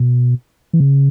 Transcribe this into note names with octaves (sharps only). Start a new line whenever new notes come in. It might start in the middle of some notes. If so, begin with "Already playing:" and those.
Already playing: B2
E3
C#3